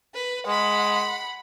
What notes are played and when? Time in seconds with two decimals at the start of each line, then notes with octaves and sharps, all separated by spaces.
0.14 B4
0.47 G#3 F#5 B5